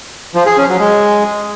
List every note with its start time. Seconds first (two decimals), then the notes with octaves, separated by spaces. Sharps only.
0.35 F3
0.46 G#4
0.57 C#4
0.68 F#3
0.79 G#3